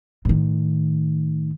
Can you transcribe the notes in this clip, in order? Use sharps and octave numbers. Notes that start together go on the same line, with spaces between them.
A2 D#3